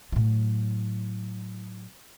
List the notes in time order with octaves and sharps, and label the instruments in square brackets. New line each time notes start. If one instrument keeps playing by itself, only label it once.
[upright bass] A2 F#3